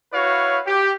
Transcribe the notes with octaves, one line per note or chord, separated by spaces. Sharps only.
E4 F#4 B4 C#5 F5
G4